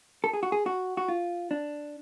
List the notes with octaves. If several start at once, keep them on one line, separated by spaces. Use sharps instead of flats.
A4
G#4
F#4
G#4
F#4
F#4
F4
D4